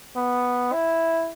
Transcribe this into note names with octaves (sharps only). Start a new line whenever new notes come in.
B3
E4